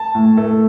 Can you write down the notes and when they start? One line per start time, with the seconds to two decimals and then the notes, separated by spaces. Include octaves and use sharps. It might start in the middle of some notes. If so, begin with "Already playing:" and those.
Already playing: A5
0.15 A2
0.37 A3